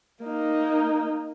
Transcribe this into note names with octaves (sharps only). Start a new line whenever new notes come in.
A#3 D#4